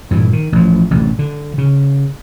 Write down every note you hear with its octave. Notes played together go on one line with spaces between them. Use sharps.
G2 A#2 E3
D#3
A1 F3
A1 C3
D3
C#3